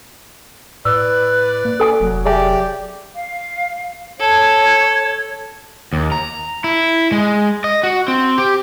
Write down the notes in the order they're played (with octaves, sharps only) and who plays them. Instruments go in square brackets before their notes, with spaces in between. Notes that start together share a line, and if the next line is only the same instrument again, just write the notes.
[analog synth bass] A2 [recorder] B4 [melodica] D5 [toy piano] E6
[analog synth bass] A#3
[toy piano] A4 G#5 D#6
[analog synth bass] F1 [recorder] F#3
[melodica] G4 D5 [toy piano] G#4 E5 G#5
[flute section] F5
[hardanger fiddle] A4 [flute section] C#5 G#6
[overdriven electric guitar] D#2
A#5
E4
G#3
D#5
F#4
C4
G4